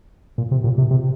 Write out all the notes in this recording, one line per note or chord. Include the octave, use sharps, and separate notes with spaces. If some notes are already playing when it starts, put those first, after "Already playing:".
A#2
C3
A#2
C3
C3